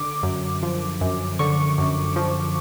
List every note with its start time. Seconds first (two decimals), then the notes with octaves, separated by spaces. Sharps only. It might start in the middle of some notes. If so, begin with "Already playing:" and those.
Already playing: D3 D6
0.23 F#2
0.63 F3
1.01 F#2
1.39 D3 C#6
1.78 F#2
2.16 F3